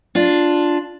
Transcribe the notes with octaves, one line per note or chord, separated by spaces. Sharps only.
D4 F4